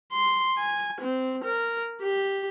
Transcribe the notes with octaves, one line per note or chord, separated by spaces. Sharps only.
C6
G#5
C4
A#4
G4